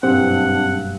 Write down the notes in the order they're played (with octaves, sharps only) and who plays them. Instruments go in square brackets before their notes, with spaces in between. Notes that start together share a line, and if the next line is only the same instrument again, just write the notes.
[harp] F#1 G2 B2 [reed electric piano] C4 G4 [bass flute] D4 [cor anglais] F#5